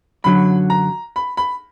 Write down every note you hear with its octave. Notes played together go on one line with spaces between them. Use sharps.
F#2 D3 F#3 B5
A#5
B5
B5